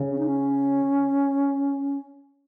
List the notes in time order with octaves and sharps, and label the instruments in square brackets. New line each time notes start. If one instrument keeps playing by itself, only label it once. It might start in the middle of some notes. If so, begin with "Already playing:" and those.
Already playing: [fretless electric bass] C#3
[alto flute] C#4
D#4
C#4